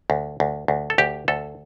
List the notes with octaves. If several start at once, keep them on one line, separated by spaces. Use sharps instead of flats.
D2
D2
D2
A4
D2 G4
D2 A4